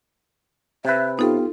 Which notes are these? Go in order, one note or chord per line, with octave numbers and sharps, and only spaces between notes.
C3 B4 E5
B3 D#4 F4 G4 A4